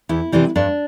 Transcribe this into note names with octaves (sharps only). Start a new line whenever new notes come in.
E2 E4
C3 E3 G3
G2 D4